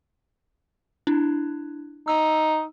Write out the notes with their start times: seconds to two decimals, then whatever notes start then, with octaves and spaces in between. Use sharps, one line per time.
1.07 D4 E4
2.08 D#4 E6